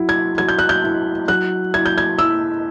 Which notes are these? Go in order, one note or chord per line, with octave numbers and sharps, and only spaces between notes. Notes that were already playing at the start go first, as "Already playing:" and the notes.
Already playing: F#3 E4
G#6
F#3 G#6
G6
F#6
G6
E4
F#3 F#6
E4 G#6
G6
G#6
E4 E6